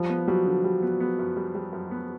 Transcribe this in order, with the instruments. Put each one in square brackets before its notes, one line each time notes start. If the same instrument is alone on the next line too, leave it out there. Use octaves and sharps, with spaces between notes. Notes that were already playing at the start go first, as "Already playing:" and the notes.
Already playing: [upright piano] F3 [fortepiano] G3
[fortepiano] B3
[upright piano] F#3 [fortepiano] G3
[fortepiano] D3
G3
B3
B3
F#2
G3
G3
F#2
B3